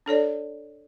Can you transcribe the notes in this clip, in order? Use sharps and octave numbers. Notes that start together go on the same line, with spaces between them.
D4 A4 C#5 D5